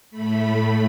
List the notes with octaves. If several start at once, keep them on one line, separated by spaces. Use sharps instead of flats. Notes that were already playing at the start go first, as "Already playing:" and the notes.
A2 A3 B5